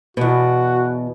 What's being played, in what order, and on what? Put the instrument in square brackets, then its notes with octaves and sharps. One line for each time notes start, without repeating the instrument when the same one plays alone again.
[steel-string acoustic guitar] E2 B2 [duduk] F#4